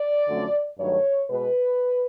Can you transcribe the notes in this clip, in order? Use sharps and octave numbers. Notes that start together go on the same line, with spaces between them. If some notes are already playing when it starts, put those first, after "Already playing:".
Already playing: D5
F2 D3 F#3 A3 C#4
G2 D#3 F#3 A3 C#5
B2 G#3 B3 B4